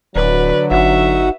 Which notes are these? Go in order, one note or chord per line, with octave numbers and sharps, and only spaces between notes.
D1 D3 F#3 B4 D5
G1 D#4 F#4 E5 F#5